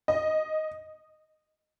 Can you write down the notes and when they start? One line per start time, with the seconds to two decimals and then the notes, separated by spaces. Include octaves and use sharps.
0.08 D#5